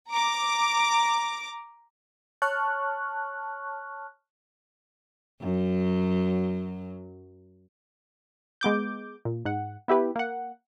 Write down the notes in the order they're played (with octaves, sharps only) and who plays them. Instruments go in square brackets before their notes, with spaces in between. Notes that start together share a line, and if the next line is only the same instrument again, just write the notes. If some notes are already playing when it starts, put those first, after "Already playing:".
[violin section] A#5 D6
[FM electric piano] C#5 A5 C#6 F6 F#6
[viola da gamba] F#2 F#3
[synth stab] G#3 B3 D6 G6
A#2
G#2 F#5
B3 E4 G4 B4
A#3 F#5